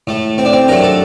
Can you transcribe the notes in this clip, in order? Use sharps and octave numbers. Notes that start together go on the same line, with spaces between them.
A2 A3
C4
D4
C4
G2 F#3 A3 A#4
A4